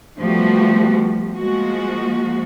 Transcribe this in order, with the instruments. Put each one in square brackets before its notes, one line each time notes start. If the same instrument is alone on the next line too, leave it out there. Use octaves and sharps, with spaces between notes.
[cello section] F3 G3 A3 B3 F#4 G4
F3 G#3 A#3 F#4